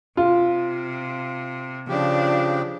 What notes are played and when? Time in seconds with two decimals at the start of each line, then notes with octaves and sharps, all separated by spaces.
0.17 C3 F4
1.89 C#3 F3 D4 G4